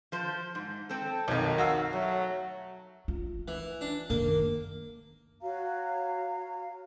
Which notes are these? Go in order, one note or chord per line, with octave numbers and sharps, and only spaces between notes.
F3 C5
G#2
C4 A4
B1 F2 D#3 F#3
F#4 F5 E6
F#3 A3
F4
E3
D4
F#2 D#3 A#3
F#4 C#5 F5 A#5